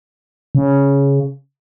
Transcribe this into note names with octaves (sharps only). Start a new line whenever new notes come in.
C#3